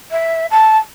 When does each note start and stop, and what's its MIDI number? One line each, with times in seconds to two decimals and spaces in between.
0.11 0.46 76
0.50 0.77 81